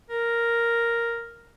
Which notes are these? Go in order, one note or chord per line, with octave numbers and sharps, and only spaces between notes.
A#4